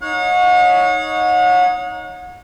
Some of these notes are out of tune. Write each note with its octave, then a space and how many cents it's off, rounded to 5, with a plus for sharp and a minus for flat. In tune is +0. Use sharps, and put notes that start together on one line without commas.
D#4 +5 C#5 +0 F#5 -40